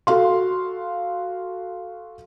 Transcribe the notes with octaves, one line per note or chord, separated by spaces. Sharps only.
F#4 A4 F5 C6